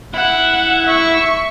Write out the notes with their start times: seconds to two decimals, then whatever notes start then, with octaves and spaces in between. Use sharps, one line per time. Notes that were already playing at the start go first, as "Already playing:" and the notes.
0.14 E4 F#5
0.85 E5 C#6